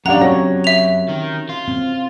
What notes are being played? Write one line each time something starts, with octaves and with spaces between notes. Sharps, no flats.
F#2 C#4 D4 G4 F5 F#5 A#5
C4 F#4 C#5 A#6
E5 F7
D#3
F4
C4